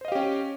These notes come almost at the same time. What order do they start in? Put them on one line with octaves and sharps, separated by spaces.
C5 D#5 F5 G4 C#4